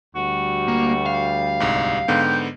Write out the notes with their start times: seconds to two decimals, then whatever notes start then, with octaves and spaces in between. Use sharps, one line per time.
0.16 D2 G3 F#4
0.68 A#3
1.06 F5
1.60 C2 G#2
2.08 G#2 D3 B3 G5